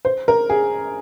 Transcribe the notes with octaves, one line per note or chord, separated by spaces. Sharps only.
C5
A#4
G#4